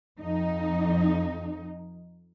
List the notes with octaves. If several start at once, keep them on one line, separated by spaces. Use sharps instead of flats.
F2 D#4